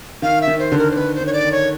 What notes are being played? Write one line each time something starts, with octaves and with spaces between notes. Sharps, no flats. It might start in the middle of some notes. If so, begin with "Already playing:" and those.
D#3 F5
E5
D#3
C5
D3
A#4
C5
D#3 B4
C5
D#3
C#5
D5
D#3
C#5